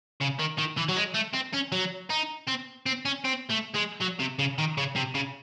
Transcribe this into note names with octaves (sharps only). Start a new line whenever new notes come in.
C#3
D#3
D#3
E3
F#3
G#3
A3
C4
C#4
F#3
D#4
C4
C4
C#4
C4
A3
G#3
F#3
C3
C#3
D#3
C#3
C3
C#3